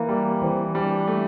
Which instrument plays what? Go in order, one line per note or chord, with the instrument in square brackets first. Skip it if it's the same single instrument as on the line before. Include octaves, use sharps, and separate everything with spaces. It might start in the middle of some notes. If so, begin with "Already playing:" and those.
Already playing: [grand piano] E3 [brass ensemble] A#3
[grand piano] G3
[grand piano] E3 [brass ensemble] C4
[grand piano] G3 [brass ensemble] D4
[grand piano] A3